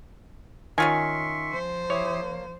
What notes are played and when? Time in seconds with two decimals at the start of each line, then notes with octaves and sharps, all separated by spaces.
0.78 D#3 C#4 F4 E5 G#5 C6 C#6
1.50 F3 C5
1.90 E4 G4 C#5 D#6
2.21 A#3